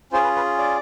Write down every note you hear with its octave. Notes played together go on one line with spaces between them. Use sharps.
C#4 F4 G#4 C5
B4
B4
D5